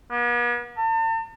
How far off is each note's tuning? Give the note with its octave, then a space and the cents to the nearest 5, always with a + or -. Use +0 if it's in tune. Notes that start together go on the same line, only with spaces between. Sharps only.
B3 -45
A5 +40